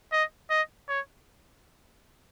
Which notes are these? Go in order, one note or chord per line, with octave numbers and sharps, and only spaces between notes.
D#5
D#5
C#5